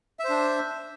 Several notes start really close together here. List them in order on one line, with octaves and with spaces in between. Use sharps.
E5 C5 D4